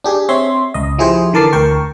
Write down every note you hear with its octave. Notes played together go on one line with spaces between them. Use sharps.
D4 G4 G#4
C4 C#5 E5 C6
C#2 D#5
F3 E4 G4 G#4 C5
D3 E3 A#4 A5 D6 C7
D2 A#4 G5 C#6